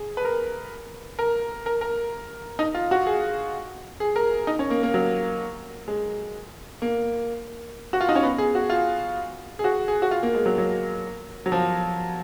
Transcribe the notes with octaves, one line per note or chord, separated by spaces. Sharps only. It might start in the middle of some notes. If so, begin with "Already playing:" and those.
Already playing: G#4
B4
A#4
A#4
A#4
A#4
D#4
F4
F#4
G#4
G#4
A#4
D#4
C#4
A#3
A#3
F#3
G#3
A#3
F#4
F4
D#4
C#4
B3
G#4
F#4
F4
G#4
F#4
G#4
F#4
F4
A#3
G#3
F#3
F#3
F#3
F3